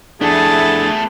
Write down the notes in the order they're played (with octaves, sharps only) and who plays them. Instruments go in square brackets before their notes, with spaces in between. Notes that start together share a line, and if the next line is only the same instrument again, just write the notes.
[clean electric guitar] F2 D4 [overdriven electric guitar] A3 B3 [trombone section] E4 A4 [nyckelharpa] G#4 A5